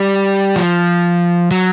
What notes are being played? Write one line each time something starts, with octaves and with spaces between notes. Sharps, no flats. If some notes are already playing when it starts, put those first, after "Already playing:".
Already playing: G3
F3
F#3